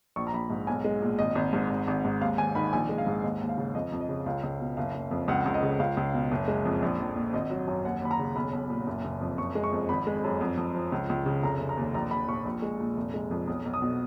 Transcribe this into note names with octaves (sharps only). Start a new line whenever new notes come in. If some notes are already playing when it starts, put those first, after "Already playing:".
A#1 C#6
A#5
A#1 B5
G#2
B1 G#5
G#3
A#2
G#1 D#5
G#1
G#2
G#1
G#1
G#2
D#2 F5
D#2 G#5
D#3 B5
A#1 G#5
G#3
F5
G#2
D#2 D#5
D#2
F5
C#3
F2 D#5
F2
D#5
C#3
C#2 F5
C#2
B2
F#1 F5
F#1
F2
C#2 F#5
C#2
D#5
C#3
C#2 F5
C#2
B2
F#1
G#3
F2
A#1
A#1
A#2
G#1 D#5
F#3
F#2
D#2 F#5
D#2 B5
A#5
C#3
B1 B5
B1
A#2
F#1
F#1
F2
F#1 C#6
G#3
C#6
F2
G#1 B5
G#3
F#2
F2
F2
F3
C#2
C#2
C#3
F1 A#5
F1
A#5
D#2
A#1 A#5
A#1 B5
A#2 C#6
A#1
G#3
A#2
F1
G#3
F2
B1 D#6
B1
D#6
B2